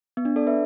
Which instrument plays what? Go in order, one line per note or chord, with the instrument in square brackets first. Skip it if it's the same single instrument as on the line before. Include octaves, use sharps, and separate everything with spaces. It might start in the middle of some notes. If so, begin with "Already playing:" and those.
[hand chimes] B3
D4
A4 D5
B4 E5